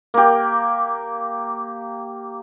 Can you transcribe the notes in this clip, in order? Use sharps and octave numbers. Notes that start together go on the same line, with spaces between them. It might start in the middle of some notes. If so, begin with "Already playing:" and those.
A#3 G4